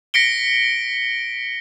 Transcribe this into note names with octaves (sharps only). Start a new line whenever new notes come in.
A#6 B6 C#7 D7 G7